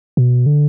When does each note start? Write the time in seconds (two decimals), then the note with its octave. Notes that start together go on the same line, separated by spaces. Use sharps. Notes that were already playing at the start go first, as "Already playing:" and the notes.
0.17 B2
0.46 D3